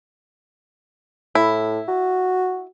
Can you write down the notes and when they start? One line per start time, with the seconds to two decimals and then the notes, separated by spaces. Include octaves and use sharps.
1.35 A2 E4
1.88 F#4